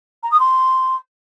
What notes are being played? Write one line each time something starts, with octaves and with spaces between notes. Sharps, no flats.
A#5
D#6
C6